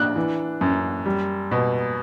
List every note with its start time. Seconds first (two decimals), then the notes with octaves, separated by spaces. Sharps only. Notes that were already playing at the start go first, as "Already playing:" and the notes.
Already playing: D4 F#6
0.16 E3
0.61 F#2
1.06 G3
1.51 B2